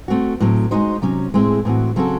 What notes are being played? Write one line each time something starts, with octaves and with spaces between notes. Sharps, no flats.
A3 C4 F#4
A2 F#3 C4
G#3 D#4 F#4 C5 D#5
C3 F#3 C#4
A2 G#3 C4 E4 G#4
A2 E3 C4 F#4
C#3 F#3 C4 F#4 A4